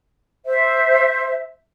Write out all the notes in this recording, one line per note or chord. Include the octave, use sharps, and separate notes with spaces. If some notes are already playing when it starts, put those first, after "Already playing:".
C5 E5